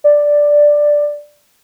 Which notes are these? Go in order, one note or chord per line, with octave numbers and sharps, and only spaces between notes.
D5